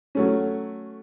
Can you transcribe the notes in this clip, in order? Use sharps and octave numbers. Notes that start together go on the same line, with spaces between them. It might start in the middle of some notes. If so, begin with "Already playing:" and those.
F#3 A3 C#4